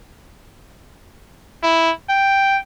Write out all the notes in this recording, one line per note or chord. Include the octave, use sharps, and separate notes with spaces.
E4
G5